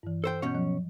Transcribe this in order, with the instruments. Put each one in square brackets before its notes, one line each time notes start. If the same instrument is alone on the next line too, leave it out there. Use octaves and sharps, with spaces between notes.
[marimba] G2 E3
[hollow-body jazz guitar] A4 C5 G5
[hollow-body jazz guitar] B2 C#4 C#5 [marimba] F#5 G6
[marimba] F3 F#3